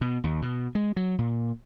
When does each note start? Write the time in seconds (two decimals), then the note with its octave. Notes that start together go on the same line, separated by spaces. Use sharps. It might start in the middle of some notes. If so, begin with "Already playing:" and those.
0.01 B2
0.24 D#2
0.42 B2
0.75 G#3
0.96 F#3
1.19 A#2